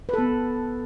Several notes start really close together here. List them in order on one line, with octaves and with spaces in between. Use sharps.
B4 A4 B3